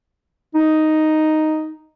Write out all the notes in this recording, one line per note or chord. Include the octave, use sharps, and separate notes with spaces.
D#4